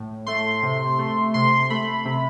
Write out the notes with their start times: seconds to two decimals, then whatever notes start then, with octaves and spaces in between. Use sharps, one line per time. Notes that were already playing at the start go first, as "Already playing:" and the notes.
Already playing: A2
0.27 A3 C6
0.63 C3
0.99 A3
1.34 C3 C6
1.70 A3 B5
2.05 C3